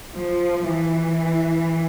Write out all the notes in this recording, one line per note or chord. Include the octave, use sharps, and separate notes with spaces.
F3
E3